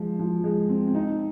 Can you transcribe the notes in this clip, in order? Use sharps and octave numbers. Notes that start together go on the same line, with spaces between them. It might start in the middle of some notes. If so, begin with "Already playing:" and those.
Already playing: F3 G#3
F3
G#3
C4
C4
D#4